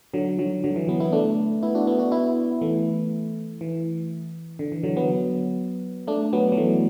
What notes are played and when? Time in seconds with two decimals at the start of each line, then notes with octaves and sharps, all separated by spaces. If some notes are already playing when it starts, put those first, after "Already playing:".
0.14 D3 F#3
0.39 D3 F#3
0.64 D3 F#3
0.76 E3
0.88 F#3 B3
1.00 B3 E4
1.12 A3 D4
1.63 B3 E4
1.75 D4 F#4
1.87 B3 E4
1.99 D4 F#4
2.12 B3 E4
2.61 E3 A3
3.61 E3
4.59 D3
4.72 E3
4.83 D3 F#3
4.97 F#3 B3
6.07 A3 D4
6.33 F#3 B3
6.52 F#3
6.57 E3 A3